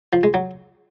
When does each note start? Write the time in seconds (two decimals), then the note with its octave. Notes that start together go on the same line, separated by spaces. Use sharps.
0.13 F3
0.23 G#3
0.34 F#3